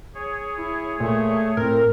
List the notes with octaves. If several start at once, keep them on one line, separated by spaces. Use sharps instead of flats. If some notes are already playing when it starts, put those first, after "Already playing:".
G#4 C#5
E4
A#2 A3
A2 C4 A#4 A#5